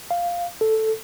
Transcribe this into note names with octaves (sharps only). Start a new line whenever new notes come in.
F5
A4